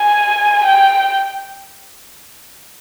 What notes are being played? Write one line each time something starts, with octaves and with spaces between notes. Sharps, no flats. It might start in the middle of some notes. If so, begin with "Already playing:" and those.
Already playing: G#5
G5